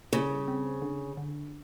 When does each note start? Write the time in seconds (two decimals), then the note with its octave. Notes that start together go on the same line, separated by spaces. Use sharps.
0.13 C#3 G3
0.48 C4
0.82 D3
1.17 D3